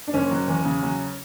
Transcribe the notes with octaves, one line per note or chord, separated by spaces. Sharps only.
D4
F#1 C#4
F#3
E2
C#3
F#3